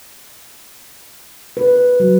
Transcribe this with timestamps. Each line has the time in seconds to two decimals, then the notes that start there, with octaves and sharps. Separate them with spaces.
1.57 B4
2.00 F#3